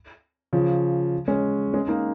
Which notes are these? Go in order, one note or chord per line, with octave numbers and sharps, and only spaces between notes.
C#3 F3
G#3 C#4
G#3 C#4
A#3 D#4